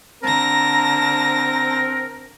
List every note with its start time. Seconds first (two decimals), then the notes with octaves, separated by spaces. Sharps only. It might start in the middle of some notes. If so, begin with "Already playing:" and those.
0.23 D3 C4 A#4 A5 A#5 A#6